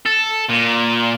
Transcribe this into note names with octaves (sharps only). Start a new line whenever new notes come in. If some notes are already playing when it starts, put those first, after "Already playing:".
A4
A#2